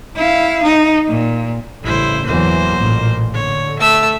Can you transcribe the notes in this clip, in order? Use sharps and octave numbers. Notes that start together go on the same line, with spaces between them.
E4 F5
D#4
A#2
A1 G2 C#3 E4 C5
E2 E3 F#3 A#3 C5
A1 A#2
D3 C#5
A3 E5 E6